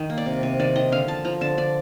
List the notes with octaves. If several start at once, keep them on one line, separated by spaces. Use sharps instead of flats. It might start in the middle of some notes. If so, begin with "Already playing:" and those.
Already playing: D#3
A#3
D5
C3
C3
D#3 D5
D#3 D#5
D3 F5
F3 A5
F3 A#5
D3 A5
D3 D5